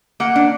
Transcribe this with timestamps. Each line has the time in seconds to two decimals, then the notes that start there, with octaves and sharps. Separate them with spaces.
0.20 A#3 F#5
0.36 D4